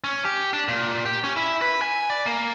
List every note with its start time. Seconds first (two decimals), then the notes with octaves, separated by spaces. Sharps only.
0.04 C#4
0.25 G4
0.53 D4
0.68 A#2
1.05 G4
1.24 C#4
1.36 E4
1.61 B4
1.82 G#5
2.10 D5
2.26 A#3